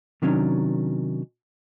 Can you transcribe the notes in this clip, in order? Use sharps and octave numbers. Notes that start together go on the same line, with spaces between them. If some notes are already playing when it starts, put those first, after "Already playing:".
C3 D#3 F#3 C#4 D4